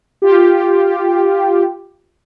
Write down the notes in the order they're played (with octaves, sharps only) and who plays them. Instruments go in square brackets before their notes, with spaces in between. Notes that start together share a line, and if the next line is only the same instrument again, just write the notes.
[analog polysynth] F4 G4